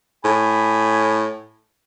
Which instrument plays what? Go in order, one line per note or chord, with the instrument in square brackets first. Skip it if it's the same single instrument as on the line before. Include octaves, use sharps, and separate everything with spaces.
[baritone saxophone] A2 [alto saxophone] G#5 [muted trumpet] B5